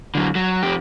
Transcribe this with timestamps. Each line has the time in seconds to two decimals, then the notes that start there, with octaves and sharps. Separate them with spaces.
0.15 D3 F#3
0.35 F#3
0.63 F2 G4